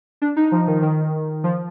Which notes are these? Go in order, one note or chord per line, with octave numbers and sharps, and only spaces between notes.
D4
D#4
F3
D#3
D#3
F3